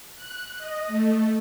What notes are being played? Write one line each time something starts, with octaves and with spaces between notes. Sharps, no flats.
F#6
D#5
A3